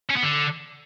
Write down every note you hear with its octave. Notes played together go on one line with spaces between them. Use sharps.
C#4
B3
D3